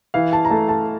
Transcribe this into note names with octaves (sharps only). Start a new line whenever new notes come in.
E3 F5
A5
A#5
A3 A5
A5